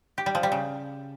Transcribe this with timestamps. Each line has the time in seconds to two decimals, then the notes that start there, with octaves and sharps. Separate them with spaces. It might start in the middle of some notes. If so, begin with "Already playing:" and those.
0.18 G4
0.26 G3
0.35 F3
0.43 G3
0.52 C#3